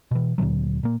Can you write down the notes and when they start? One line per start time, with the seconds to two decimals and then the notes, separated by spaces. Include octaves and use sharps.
0.11 B2 E3
0.38 D2 A#2 D3 F#3
0.83 A#2 A#3